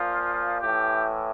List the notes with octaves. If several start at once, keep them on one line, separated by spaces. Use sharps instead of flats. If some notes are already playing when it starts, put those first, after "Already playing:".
Already playing: A#2 F3 F4
A2 E3 G4